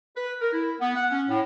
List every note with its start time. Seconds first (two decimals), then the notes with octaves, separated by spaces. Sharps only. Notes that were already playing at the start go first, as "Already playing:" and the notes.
0.16 B4
0.41 A#4
0.53 E4
0.81 B3
0.96 F#5
1.11 C#4
1.29 A2